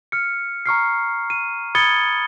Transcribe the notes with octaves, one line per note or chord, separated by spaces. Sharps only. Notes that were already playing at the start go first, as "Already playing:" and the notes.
F6 C#7
A#5 C#6 F6 C7
D#7
B5 D#6 G#6 A6 C#7 G7